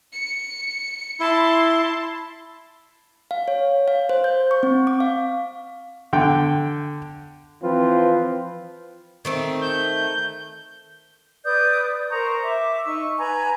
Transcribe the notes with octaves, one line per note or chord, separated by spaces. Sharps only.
C#7
E4 A5 C6
F5
C#5
F5
C5
G6
C#6
C4
D6
F5
D3 G5
E3 F3 C4 F4 B4
D#3 A3 C4
G6
B4 D5 D#6 G6
A#4 C5 A#5 C#6
E5 D6
D#4 C#6 E6
B4 G#5 A#5 B5